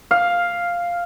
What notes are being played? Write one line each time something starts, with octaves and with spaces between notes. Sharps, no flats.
F5